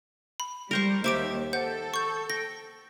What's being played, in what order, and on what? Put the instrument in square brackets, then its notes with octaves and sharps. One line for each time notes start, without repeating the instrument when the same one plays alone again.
[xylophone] B5
[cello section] G3 [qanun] A#4 C5 C#6
[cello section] D#2 [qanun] G4 E5 [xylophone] C5 D6 D7
[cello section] A4 [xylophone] C5 F#5 G6
[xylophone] C#6 G6
[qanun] G5 [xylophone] A#6